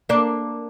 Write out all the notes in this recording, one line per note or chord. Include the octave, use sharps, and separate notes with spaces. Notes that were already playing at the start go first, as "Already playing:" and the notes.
A#3 D4